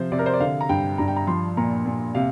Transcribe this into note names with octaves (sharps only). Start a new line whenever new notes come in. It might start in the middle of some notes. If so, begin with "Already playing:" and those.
Already playing: C3 F3 C5
C3 D5
A#4
C5
D5
D3 F5
A#5
G2 G5
G2 A#5
G5
A#5
F3 C6
A#2 A#5
A#2
C3 F5